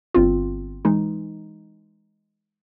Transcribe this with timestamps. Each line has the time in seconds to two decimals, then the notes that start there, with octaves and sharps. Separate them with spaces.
0.14 G1 C4 F4
0.85 E3 G#3 D#4